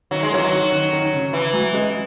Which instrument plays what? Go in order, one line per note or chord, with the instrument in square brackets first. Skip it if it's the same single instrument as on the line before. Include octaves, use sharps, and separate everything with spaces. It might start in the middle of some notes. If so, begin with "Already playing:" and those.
[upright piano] D#3 [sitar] F#3
[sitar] G#3
[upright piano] E3 [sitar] F#3
[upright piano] D#3
D#3
D#3
C#3
[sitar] E3
[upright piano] F#3
G#3